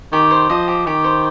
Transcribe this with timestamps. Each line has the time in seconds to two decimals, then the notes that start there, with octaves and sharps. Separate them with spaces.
0.12 D#3 G4
0.31 C5
0.50 F3 D#5
0.68 G4
0.86 D#3 G4
1.04 C5